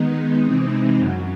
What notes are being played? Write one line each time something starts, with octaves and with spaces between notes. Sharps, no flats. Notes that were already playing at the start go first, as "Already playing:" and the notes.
Already playing: D#3 G#3 B3 D#4
C3 E3 G#3 C4 D#4
F#2 C#3 F#3